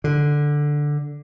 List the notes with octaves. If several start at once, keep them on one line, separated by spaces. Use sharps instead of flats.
D3